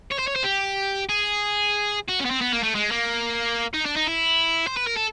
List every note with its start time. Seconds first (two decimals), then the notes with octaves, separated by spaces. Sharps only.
0.11 C#5
0.18 C5
0.27 C#5
0.36 C5
0.44 G4
1.09 G#4
2.08 F#4
2.20 C#4
2.25 B3
2.31 C4
2.42 B3
2.53 A#3
2.63 A3
2.75 G#3
2.91 A#3
3.74 D#4
3.85 D4
3.96 D#4
4.07 E4
4.67 C5
4.77 B4
4.87 A#4
4.97 A4